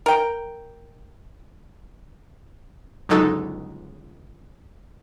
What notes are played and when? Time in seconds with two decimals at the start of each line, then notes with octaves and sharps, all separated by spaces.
0.06 A#4 G5
3.09 G1 C#2 F#3 D#4 A4